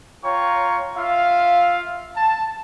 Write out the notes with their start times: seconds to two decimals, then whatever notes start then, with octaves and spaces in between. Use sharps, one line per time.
0.25 F4 C#5 G5 A#5 C#6
0.98 F4 E5 F5
2.17 A5